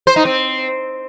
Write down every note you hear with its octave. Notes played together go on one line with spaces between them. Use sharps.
C5
D#4
C4